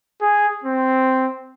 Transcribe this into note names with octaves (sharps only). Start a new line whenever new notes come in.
G#4
C4